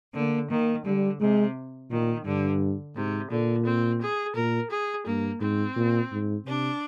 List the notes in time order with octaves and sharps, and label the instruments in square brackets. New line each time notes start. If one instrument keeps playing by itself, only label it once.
[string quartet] D3 [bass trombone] A#3
[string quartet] D#3 [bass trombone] A#3
[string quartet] D3 [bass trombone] G3
[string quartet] C3 [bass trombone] G#3
[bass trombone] A#2 [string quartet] D#3
[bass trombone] G2 [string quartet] D3
[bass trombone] G#2 [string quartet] C3
[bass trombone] A#2 [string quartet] D3
[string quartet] C4
G#4
[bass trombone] A#2 [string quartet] A#4
[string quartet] G#4
[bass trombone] G2 [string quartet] A#3
[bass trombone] G#2 [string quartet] C4
[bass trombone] A#2
G#2
[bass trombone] C3 [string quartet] D4